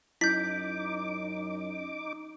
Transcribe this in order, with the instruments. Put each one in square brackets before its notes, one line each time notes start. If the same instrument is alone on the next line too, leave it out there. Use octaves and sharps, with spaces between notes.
[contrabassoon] F#2 [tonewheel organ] D#4 D6 [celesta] E4 [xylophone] G6 B6